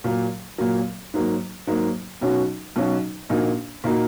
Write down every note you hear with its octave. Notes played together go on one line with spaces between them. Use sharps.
A#2 F#3 A#3
A#2 F#3 A#3
G#2 F#3 A#3
G#2 F#3 A#3
B1 B2 F#3 C#4 F#4
B1 B2 F#3 C#4 F#4
A#1 A#2 A#3 D#4 F#4
A#2 A#3 D#4 F#4